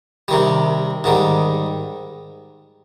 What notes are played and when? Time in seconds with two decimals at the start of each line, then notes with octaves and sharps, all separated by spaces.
0.28 C3 D#3 G3
1.04 G#2 D#3 G3